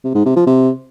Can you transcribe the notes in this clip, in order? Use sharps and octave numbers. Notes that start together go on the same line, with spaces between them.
C3
G#2
C3
F3
C3